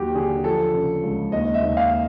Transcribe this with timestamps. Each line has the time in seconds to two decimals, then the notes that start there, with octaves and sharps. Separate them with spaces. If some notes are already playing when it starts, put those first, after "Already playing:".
Already playing: D#2 F#3 F#4 G4
0.15 D3 G#4
0.44 F3 A4
0.73 C#3
1.03 C#2
1.32 D#2 D#5
1.54 E5
1.62 D#2
1.77 F5